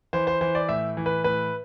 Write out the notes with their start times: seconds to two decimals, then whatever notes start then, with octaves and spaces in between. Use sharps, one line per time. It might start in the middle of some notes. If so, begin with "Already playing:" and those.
0.13 E3 C5
0.27 C5
0.41 E3 C5
0.55 D5
0.69 A2 E5
0.97 E3
1.06 B4
1.24 A2 B4